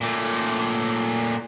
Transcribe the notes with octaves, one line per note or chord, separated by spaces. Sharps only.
A#2 A3